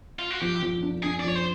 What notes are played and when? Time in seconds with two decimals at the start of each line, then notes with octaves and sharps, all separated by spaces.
0.19 F4
0.31 F#4
0.41 F3 G4
0.62 F3
0.83 D4
1.03 D4 G#4
1.20 D5
1.24 F3 C#5
1.35 C5